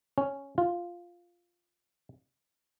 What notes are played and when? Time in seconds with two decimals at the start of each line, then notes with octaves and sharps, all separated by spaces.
0.18 C#4
0.58 F4